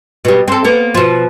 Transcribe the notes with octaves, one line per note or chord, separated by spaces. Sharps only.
B2 G3
C4 A4
A#3 B3
B2 F3